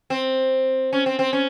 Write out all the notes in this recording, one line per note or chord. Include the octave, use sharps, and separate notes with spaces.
C4
C#4
C4
C4
C#4